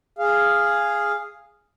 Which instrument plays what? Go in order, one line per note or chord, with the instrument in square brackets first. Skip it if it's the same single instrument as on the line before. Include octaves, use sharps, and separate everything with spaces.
[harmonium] G#4 F5